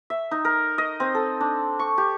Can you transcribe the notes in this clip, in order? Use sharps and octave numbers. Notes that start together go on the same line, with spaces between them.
E5
D#4
A#4
D#5
C4
A4
D4
C#6
G4